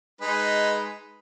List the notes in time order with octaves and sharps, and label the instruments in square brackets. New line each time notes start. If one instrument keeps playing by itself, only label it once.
[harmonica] G#3 D#4 B4